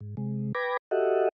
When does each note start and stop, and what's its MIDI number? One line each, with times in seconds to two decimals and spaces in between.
0.01 0.15 44
0.17 0.52 48
0.17 0.52 56
0.55 0.77 71
0.55 0.77 79
0.55 0.77 83
0.55 0.77 86
0.55 0.77 92
0.55 0.77 94
0.91 1.29 66
0.91 1.29 67
0.91 1.29 69
0.91 1.29 75
0.91 1.29 76
0.91 1.29 78